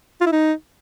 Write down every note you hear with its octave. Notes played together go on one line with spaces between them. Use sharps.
F4
E4
D#4